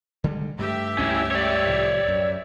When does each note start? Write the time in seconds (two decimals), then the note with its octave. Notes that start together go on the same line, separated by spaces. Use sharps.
0.24 D3 G3 G#3
0.59 G2 A3 G4 E5
0.98 C#2 G2 A3 C#4 E4
1.31 C#5 D5
1.66 C2 A2 F3
2.08 F#2